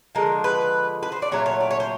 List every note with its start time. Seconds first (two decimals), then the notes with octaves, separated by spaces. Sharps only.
0.15 D3 F3 G#3 A#4
0.44 B4
1.03 B4
1.12 C5
1.22 D5
1.31 A#2 F#3 A3 C#5
1.46 C#5
1.60 D5
1.71 C#5
1.80 C5